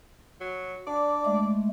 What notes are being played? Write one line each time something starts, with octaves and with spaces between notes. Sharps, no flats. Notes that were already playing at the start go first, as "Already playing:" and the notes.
F#3
D4 D5
G#3 A3